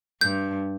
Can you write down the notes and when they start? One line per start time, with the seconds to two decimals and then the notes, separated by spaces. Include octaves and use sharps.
0.21 G2 G6